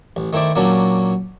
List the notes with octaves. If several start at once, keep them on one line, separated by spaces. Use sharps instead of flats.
A1
D#3 A3 E4 C5 D5
A#2 F#3 A#3 C#4 D4